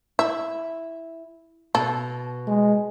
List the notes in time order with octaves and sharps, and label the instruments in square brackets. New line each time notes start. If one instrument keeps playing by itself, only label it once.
[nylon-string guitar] E4 [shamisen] E5
[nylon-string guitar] B2 [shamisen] A4
[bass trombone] G#3